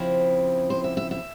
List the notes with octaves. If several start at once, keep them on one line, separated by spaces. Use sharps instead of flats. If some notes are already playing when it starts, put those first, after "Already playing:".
Already playing: C#3 F3 C4 E4
C5
E5
E5
E5